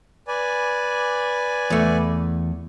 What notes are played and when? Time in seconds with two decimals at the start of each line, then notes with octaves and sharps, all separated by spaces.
0.28 B4 D5 G#5
1.70 E2 A3